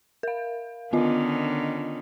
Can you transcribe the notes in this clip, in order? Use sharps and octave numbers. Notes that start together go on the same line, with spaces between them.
A#4 F5
D3 D#3 B3 C#4 F4 D#5